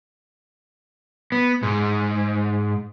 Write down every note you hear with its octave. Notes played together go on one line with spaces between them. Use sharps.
B3
G#2